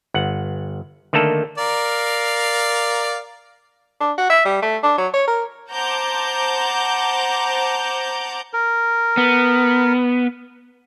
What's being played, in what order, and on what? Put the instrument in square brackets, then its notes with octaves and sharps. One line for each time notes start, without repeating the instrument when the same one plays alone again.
[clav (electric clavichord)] G1 F#5
D3 D#3 A3 A#3 A4
[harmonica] A#4 D5 F5
[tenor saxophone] D4
F#4
E5
G3
A3
D4
F#3
C#5
A#4
[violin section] C5 F#5 A5 A#5 D6 G6
[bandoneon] A#4
[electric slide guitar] B3